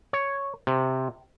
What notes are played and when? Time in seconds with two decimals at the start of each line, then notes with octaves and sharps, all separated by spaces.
0.13 C#5
0.67 C3